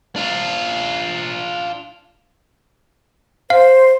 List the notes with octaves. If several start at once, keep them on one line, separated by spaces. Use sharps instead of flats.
D4 F4
C5 F5